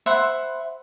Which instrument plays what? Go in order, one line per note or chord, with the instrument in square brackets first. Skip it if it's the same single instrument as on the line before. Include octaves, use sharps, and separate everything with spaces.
[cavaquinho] C5 E5 F#5 B5